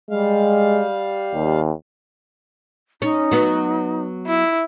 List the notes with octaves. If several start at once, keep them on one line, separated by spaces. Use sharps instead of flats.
G3 G#3 F5
D#2
C#4 D#4
F#3 B3
E4